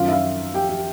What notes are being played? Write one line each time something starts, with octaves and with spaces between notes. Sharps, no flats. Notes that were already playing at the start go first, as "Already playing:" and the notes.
Already playing: F#2 D#3 F#3 F4 F5
E5
F4 F5
G4 G5
G4 G5